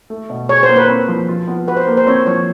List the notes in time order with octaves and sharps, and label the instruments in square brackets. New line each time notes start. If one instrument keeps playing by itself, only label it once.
[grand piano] A3
B2
[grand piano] G#4 [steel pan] C#5
[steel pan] C5
[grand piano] A#3
[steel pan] B4
[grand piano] C4
F3
F4
B3
[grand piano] F#4 [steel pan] B4
[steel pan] C5
[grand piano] A#3
[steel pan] C5
[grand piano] C4 [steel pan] C#5
[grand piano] F3 [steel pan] C#5